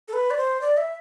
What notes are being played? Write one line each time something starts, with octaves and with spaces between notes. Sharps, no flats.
A4
B4
D5
C5
D5
E5